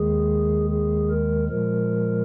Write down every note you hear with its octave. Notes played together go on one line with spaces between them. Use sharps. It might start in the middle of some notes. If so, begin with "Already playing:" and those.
Already playing: D#2 D#3 G#3 G#4
G#4
A#4
A#2 F3 G#3 A#4